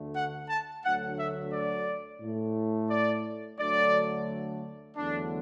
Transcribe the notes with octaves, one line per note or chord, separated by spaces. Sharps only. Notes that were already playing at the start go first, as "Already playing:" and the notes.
Already playing: D2 D3 A3
F#5
A5
D2 D3 F#3 A3 F#5
E5
D5
A2 A3
D5
D2 D3 F#3 A3 D5
E2 D3 F#3 A3 D4